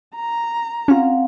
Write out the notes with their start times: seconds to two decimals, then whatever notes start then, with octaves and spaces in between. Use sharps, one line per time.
0.15 A#5
0.88 C4 C#4 F4 F5 F#5